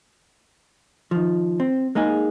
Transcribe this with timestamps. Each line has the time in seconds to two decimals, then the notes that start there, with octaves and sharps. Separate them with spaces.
1.11 D#3 F3
1.60 C4
1.95 G#3 A#3 D#4 G#4